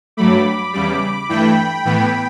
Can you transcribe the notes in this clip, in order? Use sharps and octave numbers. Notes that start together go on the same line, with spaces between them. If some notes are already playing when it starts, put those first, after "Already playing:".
G2 F#3 A3 B5 D6
E2 C#3 G3 B5 D6
G2 E3 A3 G5 B5
A2 E3 B3 G5 B5